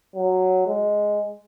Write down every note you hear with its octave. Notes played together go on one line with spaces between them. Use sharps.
F#3
G#3